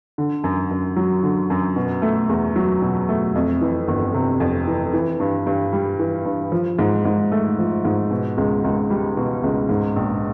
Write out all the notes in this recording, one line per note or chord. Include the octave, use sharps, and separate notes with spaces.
D3
F#2
F#2
F#3
D3
F#2
B2
A3
E2
F#3
B2
A3
F2
E3
G1
C3
F2
E3
E3
G2
G2
G3
E3
G2
F3
G#2
G#2
A3
F3
G#2
B2
C#2
C#2
G3
B2
C#2
G#2
A#1